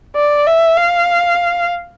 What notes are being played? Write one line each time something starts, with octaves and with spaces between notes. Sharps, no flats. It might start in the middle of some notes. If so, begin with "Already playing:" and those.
D5
E5
F5